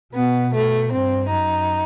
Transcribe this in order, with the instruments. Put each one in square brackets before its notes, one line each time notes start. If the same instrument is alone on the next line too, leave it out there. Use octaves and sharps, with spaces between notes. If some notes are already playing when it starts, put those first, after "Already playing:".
[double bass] B2 [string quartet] B3
[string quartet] A3
[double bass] G2 [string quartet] C4
[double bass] F#2 [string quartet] D#4